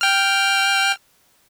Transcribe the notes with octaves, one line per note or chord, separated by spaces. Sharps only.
G5 F6